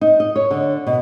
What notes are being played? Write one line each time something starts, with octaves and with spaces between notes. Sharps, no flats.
D#4
D#5
C#5
D3
B2